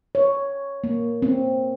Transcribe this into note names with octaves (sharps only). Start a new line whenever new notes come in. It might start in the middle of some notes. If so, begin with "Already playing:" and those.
C#5
A#3
C4